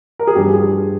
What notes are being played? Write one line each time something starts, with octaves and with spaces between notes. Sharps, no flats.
A#4
G#4
G2 F3 G4
G#4